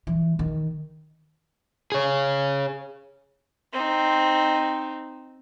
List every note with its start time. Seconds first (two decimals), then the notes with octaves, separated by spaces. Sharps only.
0.07 E3
0.39 D#3
1.92 G#4 C#5
3.72 C4 D#4